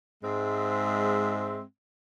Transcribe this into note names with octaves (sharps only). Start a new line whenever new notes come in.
G#2 G#3 C4 E5